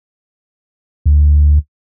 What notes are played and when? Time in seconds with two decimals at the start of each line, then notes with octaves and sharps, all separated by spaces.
1.06 D2